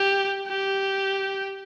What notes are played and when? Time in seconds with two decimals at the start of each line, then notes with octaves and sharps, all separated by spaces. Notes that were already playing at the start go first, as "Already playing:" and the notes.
Already playing: G4
0.48 G4